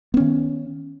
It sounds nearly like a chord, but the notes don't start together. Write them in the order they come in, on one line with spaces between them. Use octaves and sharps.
B3 C#4 D#3